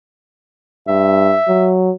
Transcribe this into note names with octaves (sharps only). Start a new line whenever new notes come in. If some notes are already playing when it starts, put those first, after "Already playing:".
G2 E5
F#3